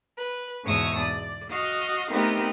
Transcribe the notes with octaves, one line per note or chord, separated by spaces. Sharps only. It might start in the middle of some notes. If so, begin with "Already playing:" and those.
B4
E2 G#2 B2 C#5 D#6 E6
D5
F#4 D#5 F5
A3 B3 C4 D#4 G4 A#4